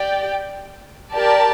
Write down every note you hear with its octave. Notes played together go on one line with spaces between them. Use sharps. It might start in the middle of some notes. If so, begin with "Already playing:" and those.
Already playing: G4 D5 G5
G4 A#4 D5 A5